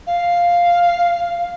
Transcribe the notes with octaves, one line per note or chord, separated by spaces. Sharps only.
F5